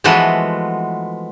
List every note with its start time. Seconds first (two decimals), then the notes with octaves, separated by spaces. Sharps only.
0.04 E3 F3 G#3 A3 B3 F#4